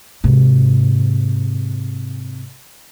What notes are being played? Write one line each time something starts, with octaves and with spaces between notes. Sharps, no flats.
G#2 C3